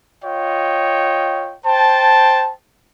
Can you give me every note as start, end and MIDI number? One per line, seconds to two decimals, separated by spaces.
0.24 1.56 65
0.24 1.56 73
0.24 1.56 75
0.24 1.56 79
1.65 2.53 72
1.65 2.53 79
1.65 2.53 81